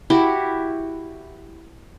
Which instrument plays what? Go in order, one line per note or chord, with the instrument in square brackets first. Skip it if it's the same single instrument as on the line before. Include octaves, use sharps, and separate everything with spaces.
[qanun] E4 F#4 G4